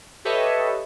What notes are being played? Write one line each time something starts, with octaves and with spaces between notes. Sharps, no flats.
G4 A4 B4 C#5 D#5 E5